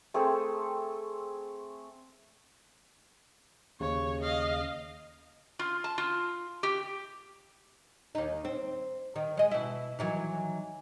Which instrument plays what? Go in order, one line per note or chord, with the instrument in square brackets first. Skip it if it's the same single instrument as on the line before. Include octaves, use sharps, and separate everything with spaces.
[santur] A3 C4 G#4 A4
[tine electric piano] D#2 C#3 [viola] C#5
[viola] D#5 F5
[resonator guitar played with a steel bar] F4
A5
F4
G4
[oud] D#2 D#4
C4
D#3
G#3 D#5
B2 E4
D#3 E3 F#3